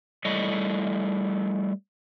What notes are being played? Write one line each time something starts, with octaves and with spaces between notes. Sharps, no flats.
G3 A3 E4 A4 C#5 D#5